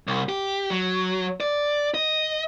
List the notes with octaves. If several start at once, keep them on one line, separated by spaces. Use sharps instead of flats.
C2
G4
F#3
D5
D#5